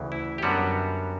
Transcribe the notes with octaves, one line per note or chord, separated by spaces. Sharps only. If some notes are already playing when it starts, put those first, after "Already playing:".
Already playing: D2 C#3 E3
E4
G4
F#2 D3 G3 B3 F#4